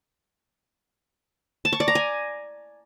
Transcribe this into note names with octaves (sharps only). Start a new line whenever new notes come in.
A5
C#6
D5
A#5
G#5